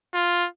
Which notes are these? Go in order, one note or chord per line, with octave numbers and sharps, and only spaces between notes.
F4